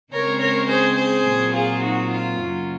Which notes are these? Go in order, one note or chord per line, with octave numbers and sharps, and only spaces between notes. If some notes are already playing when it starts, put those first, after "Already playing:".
C#3 G#3 C4 A#4 C#5
A#4 C#5
G#4 C5
G#4 C5
A#2 F#3 C4
F4 G#4
D#4 F#4
F4
F#2 C#3 F#3 A#3